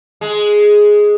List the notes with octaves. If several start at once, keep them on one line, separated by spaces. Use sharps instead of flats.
G#3